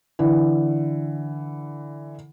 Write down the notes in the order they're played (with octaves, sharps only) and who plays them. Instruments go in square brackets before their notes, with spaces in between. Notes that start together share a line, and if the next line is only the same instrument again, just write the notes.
[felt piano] D3 E3